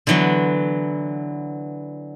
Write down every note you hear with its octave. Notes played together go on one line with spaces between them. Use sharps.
D3 E3 F#3 B3